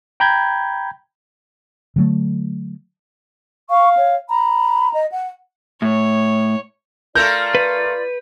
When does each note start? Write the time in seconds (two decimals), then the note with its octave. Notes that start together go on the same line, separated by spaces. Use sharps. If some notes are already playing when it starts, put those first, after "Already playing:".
0.20 G5 A#5 B5 G6 G#6
1.96 D3 F#3 A3
3.70 F5 C#6
3.97 C#5
4.29 A#5 B5
4.94 D#5
5.12 F#5
5.82 A2 C#5
7.15 A3 F4 A4 A#4 D5 G6
7.55 B4